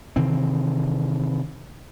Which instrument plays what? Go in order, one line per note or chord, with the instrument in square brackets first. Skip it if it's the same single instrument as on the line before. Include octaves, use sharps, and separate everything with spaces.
[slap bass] C3 D#3 E3 C4